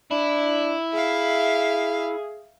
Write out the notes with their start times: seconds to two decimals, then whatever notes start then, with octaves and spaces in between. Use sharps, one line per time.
0.11 D4 E4
0.93 G#4 E5 F5